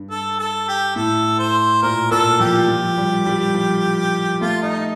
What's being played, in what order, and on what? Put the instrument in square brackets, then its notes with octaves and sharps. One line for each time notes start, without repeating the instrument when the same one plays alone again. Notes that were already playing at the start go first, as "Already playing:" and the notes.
Already playing: [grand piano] G2
[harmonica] A4
A4
G4
[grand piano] A2 [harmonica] A4
[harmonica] C5
[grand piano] A#2 [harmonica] A#4
[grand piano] A#2 [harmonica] A4
[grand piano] F3 [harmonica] G4
[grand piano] F3
G3
G3
F3
[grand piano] A3 [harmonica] F4
[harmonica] D#4